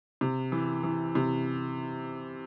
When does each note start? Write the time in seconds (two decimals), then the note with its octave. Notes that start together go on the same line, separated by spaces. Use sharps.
0.21 C3
0.52 E3
0.83 E3
1.15 C3